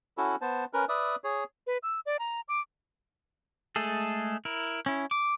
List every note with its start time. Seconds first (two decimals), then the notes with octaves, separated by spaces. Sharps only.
0.18 C#4 E4 F#4 A4
0.41 B3 C5 A5
0.73 C#4 A#4 B4
0.89 B4 D5 E5 D#6
1.24 G#4 C#5
1.67 B4
1.83 E6
2.06 D5
2.19 A#5
2.48 D6
3.76 G#3 A3 G#4 A4
4.45 E4 A#4
4.86 C#4 E4
5.11 D6